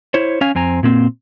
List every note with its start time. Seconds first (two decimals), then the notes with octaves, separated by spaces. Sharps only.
0.14 E4 C5 C#5
0.41 C#4 F5 G#5
0.55 F2 C4 G#5 A#5
0.83 A#2 A#3 C4